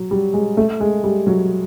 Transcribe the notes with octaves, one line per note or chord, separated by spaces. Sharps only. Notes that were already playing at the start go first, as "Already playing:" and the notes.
Already playing: F#3
G3
G#3
A3
G#3
G3
F#3